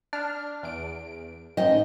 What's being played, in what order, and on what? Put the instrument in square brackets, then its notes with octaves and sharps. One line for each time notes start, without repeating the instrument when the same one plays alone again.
[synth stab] D4 F6
E2 D7
[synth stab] A1 G#2 [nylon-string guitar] D#5 G5